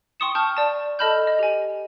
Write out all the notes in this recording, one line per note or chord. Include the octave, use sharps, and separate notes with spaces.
G5 C6 C#6 D#6 C#7 E7
G5 A5 C#6 F6 G6
D5 A5
A4 D#5 A5 B5 F6 G6
D#5
G4 G#5